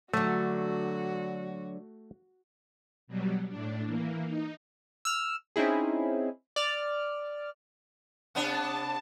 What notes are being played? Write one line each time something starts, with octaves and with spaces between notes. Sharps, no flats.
D3 F#3 A3 F#4
B2 F#3 G3
A2 D4
E3 A#3
D#4
E6 F6
C4 C#4 D#4 E4 G#4
D5 F6
C3 B3 D4 A5